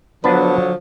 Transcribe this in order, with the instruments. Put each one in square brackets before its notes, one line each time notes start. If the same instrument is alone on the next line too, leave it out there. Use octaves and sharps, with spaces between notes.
[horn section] D3 F3 F#3 [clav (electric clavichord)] B3 D4 B4